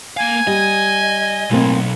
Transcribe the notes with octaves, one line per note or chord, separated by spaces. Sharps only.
A#3 F5 G#5
G3 D#5
B1 A2 A#3 C4